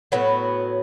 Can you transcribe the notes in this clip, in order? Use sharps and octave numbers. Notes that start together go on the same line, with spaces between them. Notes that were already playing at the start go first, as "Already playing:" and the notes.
A2 F#3 B3 F#4